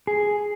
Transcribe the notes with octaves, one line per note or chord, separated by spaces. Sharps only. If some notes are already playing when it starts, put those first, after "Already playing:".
G#4